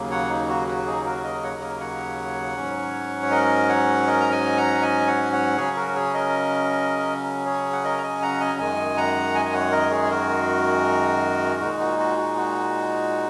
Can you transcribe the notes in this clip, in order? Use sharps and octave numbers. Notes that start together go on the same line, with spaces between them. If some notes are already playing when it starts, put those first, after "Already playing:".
Already playing: D#2 C#3 F#3 A#3
C#5 F#5
D#4
F#4
F#4
D#4 G#4
F#4 A#4
A#4 D#5
C#5 F#5
A#4 D#5
C#5 F#5
G#2 F#3 C#4
C#5
A#4 D#5
C#5 F#5
A#4 D#5
A#5
D#5 G#5
F#5 A#5
D#5 G#5
C#5 F#5
C#5 F#5
C#3 F#3 C#4 G#4 C#5
F#4 A#4
G#4 C#5
A#4 D#5
G#4 C#5
F#5
A#4 D#5
A#5
D#5 G#5
F#5 A#5
D#5 G#5
F#2 D#3 G#3 D#5 G#5
F#5 A#5
D#5 G#5
G#5
C#5 F#5
A#4 D#5
G#4 C#5
C#5
F#4 A#4
A#2 G#3 D#4 F#4
F#4
F#4
F#4
F#4